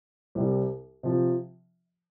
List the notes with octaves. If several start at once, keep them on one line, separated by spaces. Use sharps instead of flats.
C2 C3 G3
C3 F3